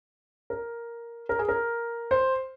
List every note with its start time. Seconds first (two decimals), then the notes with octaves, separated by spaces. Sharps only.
0.50 A#4
1.29 A#4
1.39 G#4
1.49 A#4
2.11 C5